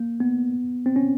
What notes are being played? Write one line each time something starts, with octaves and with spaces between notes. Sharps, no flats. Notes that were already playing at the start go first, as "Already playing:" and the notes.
Already playing: A#3
B3
C4
C#4